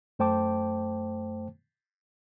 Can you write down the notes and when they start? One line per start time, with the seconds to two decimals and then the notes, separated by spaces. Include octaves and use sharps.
0.19 F#2 A3 C5 G5 A5 D6